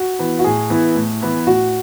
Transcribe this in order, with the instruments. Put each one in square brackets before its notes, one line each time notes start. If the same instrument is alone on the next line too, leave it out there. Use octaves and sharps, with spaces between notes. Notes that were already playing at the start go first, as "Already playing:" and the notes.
Already playing: [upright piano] F#4
[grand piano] E3 B3 E4
[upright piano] F#4
[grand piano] A2 [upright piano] G#4
[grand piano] E3 B3 E4
A2
E3 B3 E4
[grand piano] A2 [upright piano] F#4